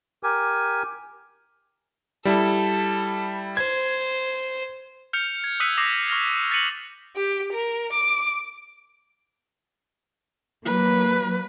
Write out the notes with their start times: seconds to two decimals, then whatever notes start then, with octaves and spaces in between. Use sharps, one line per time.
0.23 G4 A#4 G#5
2.25 G3 E4 A4
3.57 C5 G#6
5.13 F6 G6 C#7 F7
5.44 G#6
5.60 D#6 E6 F#6 B6 C#7 D#7
5.78 D6 D#6 A#6 C7 F7
6.08 C#6 F6 A#6 F7
6.51 F#6 A6 A#6 C#7 D#7 F#7
7.16 G4
7.52 A#4
7.93 D6
10.65 F#3 A#3 B4